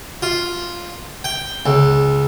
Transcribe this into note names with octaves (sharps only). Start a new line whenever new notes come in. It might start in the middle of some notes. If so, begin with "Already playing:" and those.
F4
G5
C#2